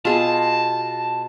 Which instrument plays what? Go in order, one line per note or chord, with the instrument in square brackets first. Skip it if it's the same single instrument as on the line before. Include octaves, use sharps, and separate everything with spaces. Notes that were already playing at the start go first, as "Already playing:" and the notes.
[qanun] B2 E5 F5 [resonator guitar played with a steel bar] F4 G#4 [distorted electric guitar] A5